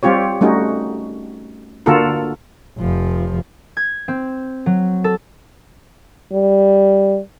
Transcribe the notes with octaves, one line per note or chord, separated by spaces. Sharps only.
G3 C4 F4 G4 C#5
G3 A3 C#4 D#4 F#4
D3 A#3 F4 F#4 A4 A#4
F1 F3
G#6
C4
F#3
A4
G3